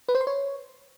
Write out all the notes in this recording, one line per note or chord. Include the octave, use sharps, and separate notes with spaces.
B4
C5
C6
C#5